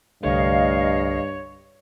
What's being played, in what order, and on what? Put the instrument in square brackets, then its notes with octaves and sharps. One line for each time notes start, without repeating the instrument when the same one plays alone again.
[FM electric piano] C2 D3 A3 [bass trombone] G2 [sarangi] C#5 [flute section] D#5 F5